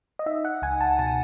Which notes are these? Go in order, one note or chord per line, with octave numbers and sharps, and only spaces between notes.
D#5
D#4 E5
F#5
C#2 G#5
A5
B2 A5